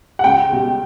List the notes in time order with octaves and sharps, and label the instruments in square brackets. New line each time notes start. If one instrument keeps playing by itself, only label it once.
[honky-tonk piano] F#5
C#2 G5
B2 G3